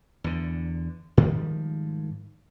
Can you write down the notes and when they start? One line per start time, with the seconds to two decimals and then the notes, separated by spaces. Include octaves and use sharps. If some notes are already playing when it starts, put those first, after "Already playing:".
0.24 E2 D3
1.17 G#2 D#3 F3 G3